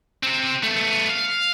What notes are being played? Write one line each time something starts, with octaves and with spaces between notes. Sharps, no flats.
C3 C4
A3 B3
F5